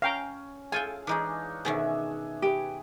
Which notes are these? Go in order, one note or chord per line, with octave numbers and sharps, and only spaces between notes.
C#4 F5 G5 A#5
F4 G#4 A4 F5 G5 G#5
E3 G#3 D4 D#4 G#4 C#5
B2 D#3 C#4 G#4 E5
G4 B4 D#6